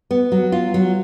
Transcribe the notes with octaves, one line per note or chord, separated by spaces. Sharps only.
B3
F#3
F4
F#3